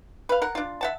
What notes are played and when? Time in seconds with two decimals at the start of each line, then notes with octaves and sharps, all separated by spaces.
0.29 B4 F5
0.42 A#4 F#5
0.55 D4 F4
0.81 E5 F#5 A5